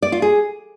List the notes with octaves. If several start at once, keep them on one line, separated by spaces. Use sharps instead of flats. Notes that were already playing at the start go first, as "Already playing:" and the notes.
D5
F4
G#4